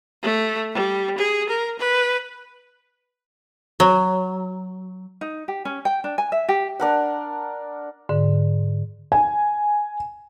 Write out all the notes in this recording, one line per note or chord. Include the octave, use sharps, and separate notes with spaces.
A3
G3
G#4
A#4
B4
F#3
D#4
G4
C#4
G5
D4
G#5
E5
G4
D4 A#4 F#5
G#2 D3
G#5